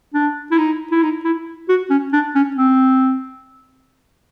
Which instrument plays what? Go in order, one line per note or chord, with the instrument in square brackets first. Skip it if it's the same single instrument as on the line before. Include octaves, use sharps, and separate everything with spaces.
[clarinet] D4
E4
D#4
E4
D#4
E4
F#4
C#4
D4
C#4
C4